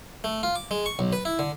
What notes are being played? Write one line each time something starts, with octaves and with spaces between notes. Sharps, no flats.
A3
F4
D6
G#3
C#6
B1
B4
E4
D3